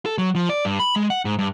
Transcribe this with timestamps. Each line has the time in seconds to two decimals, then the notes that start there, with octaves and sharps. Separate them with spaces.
0.06 A4
0.18 F#3
0.35 F3
0.49 D5
0.65 G2
0.79 B5
0.96 G#3
1.10 F#5
1.25 G#2
1.39 G2